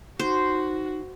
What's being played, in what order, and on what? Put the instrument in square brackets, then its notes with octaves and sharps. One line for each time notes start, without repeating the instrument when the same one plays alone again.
[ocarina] D#4 [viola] F#4 [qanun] C5